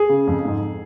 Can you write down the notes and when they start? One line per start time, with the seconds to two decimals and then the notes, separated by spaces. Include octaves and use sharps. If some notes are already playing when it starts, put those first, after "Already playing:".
Already playing: G#4
0.09 C#3
0.27 F2
0.45 G#2